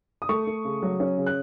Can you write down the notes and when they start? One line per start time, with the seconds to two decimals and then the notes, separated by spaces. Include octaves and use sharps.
0.22 D#6
0.29 A3 C#6
0.47 A3
0.65 C#3
0.83 F#3
1.00 C#4
1.17 C#3
1.26 F#6